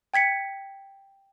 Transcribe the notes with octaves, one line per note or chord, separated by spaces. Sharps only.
G5 G#6 B6 C#7